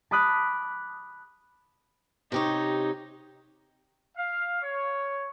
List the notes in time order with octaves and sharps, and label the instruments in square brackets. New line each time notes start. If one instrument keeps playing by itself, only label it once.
[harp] A5 B5 D6 D#6 F#6 B6
[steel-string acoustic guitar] C3 G4 C#5 [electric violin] D#4
[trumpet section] F5
C#5